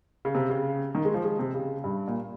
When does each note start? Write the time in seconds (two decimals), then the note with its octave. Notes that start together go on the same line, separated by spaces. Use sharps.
0.25 C#3
0.35 C3
0.50 C#3
0.95 D#3
1.05 G#3
1.14 F3
1.24 G#3
1.39 C3
1.54 C#3
1.84 G2
2.07 A#2